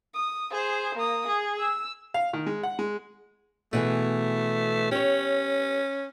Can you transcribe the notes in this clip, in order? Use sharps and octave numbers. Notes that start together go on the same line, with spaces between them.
D#6
G#4 C5
A#3 D#6
G#4
E6
F5
D#3
G#3
F#5
G#3
B2 E3 A3 G#4
C#4 G4 C#5